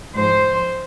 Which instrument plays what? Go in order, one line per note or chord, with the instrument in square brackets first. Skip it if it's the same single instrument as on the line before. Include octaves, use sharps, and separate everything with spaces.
[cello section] G#2 F3 G#3 C5